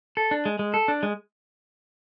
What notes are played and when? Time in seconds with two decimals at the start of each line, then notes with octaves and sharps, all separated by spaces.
0.17 A4
0.31 D4
0.45 G#3
0.59 G#3
0.74 A4
0.88 D4
1.03 G#3